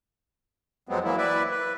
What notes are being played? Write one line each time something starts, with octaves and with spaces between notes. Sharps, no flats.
F2 F#3 G#3 B3 C4
E3 F#3 A#3 E4
E4 B4 D5 E5
B4